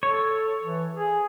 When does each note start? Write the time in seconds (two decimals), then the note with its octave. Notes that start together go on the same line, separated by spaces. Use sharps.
0.03 A4 C#5
0.63 E3
0.94 G#4